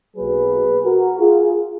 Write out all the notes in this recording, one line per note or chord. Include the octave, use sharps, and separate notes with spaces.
B1 B2 F#3 A#3 G#4 B4
F#4 A#4
F4 G#4